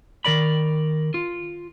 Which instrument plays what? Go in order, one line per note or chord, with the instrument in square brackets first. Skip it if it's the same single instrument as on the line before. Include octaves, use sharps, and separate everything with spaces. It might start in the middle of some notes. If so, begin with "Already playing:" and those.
[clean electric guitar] D#3 A#4 D5 B5
F4